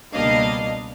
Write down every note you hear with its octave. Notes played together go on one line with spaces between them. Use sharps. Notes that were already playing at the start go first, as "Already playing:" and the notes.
C#2 B2 G3 A#3 D4 D#5 F5